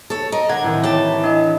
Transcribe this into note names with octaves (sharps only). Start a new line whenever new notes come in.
A4 C#5
A#4 D#5
D3 F#5 G#6
A2 D#3 E3 C4
G4 C#5 A5
D4 D#5